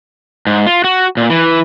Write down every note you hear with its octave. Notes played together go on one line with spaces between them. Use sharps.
G#2
F4
F#4
A#2
E3